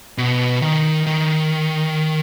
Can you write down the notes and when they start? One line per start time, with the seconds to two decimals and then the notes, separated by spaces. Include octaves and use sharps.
0.18 B2
0.62 D#3
1.07 D#3